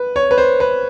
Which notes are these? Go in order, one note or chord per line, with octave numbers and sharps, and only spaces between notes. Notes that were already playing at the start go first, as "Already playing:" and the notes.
Already playing: B4
C#5
B4
C5
B4